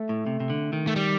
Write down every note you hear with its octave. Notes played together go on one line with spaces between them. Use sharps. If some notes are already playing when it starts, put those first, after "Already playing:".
Already playing: A3
A2
C3
C3
D3
D#3
A3
G3